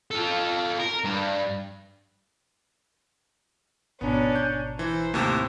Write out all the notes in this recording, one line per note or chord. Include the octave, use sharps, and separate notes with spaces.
F4 A4
A#4
G2
G#1 B2 B3 C#4 D4 A#5
G6
E3 C5
D#2 A2 C3 A#3